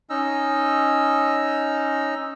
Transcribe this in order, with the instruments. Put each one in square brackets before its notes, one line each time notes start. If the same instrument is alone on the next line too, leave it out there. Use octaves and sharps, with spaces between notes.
[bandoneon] C#4 D#4 D#5 E6